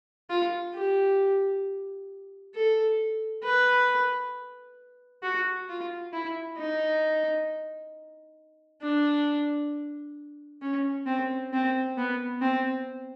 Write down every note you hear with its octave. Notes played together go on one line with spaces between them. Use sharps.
F4
G4
A4
B4
F#4
F4
E4
D#4
D4
C#4
C4
C4
B3
C4